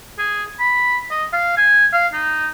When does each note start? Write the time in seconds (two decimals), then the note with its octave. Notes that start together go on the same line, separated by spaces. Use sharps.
0.18 G#4
0.60 B5
1.11 D#5
1.33 F5
1.57 G#5
1.93 F5
2.13 D#4